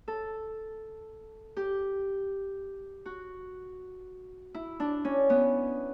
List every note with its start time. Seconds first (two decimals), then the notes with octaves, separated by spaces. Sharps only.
0.08 A4
1.57 G4
3.06 F#4
4.54 E4
4.80 D4
5.05 C#4
5.30 B3